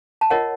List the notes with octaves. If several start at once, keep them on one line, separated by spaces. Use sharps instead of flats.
A5
F4 A#4 C#5 D#5 F#5